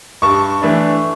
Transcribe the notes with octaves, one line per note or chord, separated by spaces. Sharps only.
G2 A5 C#6
E3 A3 D4